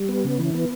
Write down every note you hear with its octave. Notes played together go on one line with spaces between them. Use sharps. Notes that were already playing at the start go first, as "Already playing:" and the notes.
Already playing: G3
B3
C#3
E3
B3